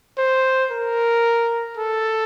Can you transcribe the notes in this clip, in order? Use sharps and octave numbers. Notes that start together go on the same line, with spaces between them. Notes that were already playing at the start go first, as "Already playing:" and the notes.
C5
A#4
A4